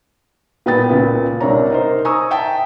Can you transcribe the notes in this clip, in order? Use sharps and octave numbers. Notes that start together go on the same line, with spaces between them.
A#2 B3 G5 A6
C#2 A#2 B4
C2 C3 D4 A#4 C#5 A#5
D#4 A#4 C5
G#5 A#5 C#6 D#6 E6
E5 G5 A5